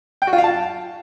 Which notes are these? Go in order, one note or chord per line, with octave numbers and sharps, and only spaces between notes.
G5
F#4
F4
F5
A5